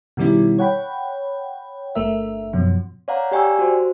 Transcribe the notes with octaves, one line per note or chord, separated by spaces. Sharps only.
B2 D#3 G3 C#4 E4
C#5 F#5 G5 B5
G1 A3 A#4 E5
F#2 B2 F3
C#5 D5 F5 F#5 A#5
G4 D5 G5 G#5 C#6 E6
F#4 C5